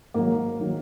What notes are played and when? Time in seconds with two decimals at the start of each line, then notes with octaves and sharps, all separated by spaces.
0.14 G#2 D#3 F#3 A#3
0.60 D#3 F#3